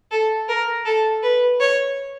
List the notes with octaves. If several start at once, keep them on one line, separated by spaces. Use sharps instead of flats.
A4
A#4
A4
B4
C#5